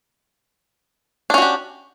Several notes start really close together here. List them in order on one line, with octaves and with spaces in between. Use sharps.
D4 C#4 F#4 G4